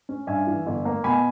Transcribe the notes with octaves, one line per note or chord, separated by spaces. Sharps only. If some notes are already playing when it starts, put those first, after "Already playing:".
C#4
G2 E5 G#5
E3
G1
A#3
B2 G#5 B5